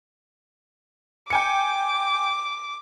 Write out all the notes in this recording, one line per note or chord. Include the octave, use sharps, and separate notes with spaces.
G5 G#5 D6 C#7